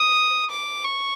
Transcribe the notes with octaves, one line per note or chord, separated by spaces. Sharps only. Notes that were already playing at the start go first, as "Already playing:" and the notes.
Already playing: D#6
D6
C#6